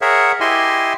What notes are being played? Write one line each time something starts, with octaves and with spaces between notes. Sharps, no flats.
G#4 A#4 C#5 E5 F#5
E4 G4 D#5 E5 G#5 C6